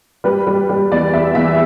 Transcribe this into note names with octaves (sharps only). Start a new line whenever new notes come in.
G3 B4
G3
G3
E2 D5
E2 E5
E2 E5